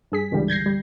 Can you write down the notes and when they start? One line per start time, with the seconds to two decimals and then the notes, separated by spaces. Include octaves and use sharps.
0.12 G2 G#4 B6
0.31 C#2 G#2 D3 E3 G3
0.48 G6 G#6 A#6 C7
0.66 G3